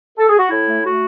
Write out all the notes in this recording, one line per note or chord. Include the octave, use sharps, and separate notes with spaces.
A4
G#4
F#4
A2 E4
A3
A3 F#4